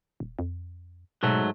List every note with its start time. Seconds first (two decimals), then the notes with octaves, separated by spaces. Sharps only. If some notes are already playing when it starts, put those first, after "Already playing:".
0.20 D#1
0.39 F2
1.23 G#2 B2 F#3 A3